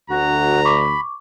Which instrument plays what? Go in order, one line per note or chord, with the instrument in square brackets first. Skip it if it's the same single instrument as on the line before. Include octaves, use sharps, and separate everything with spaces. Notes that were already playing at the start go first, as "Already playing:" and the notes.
[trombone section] D2 [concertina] F#4 [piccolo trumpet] A#5
[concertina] B5 [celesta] C#6 D6